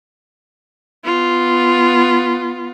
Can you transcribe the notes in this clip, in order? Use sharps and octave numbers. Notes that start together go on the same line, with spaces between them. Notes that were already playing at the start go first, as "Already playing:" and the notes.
B3 F4